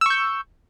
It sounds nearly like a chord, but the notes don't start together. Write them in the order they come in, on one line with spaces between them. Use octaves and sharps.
E6 C#6 G6